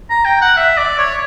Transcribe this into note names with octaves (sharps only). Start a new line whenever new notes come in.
A#5
G5
F#5
E5
D5
C#5